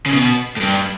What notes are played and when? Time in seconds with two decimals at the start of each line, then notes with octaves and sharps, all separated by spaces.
0.06 C#3
0.13 B2
0.57 A2
0.60 G2